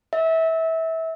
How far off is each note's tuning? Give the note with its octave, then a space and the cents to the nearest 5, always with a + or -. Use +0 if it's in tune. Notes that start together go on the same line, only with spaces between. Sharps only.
E5 -25